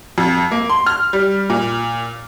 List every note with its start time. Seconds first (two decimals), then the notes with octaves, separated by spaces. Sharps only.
0.18 F2
0.51 A#3
0.69 C6
0.86 F6
1.13 G3
1.50 A#2